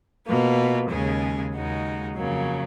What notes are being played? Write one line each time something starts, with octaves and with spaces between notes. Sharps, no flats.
B2 A#3 F4 B4
D#2 C#3 G#3 C#4 G#4
D#2 C#3 G#3 D#4 F#4
F2 C#3 F#3 A#3